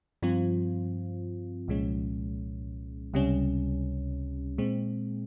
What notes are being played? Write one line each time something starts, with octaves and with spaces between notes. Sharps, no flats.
G2 F3 C4 F4
C2 A#2 F3 G#3 C#4
C#2 C3 G3 C#4
A#2 G#3 C4